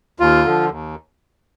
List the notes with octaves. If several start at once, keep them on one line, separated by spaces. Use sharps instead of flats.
D#2 F4
D3 F3
D#2